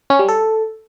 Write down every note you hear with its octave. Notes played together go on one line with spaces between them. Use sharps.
C#4
G3
A4